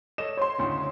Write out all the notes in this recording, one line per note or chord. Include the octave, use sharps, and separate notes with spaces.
A4 C#5 D#5 E7
C5 C#5 C6
D2 A2 C#3